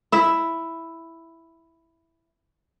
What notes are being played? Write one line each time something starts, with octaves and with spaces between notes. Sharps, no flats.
E4 E5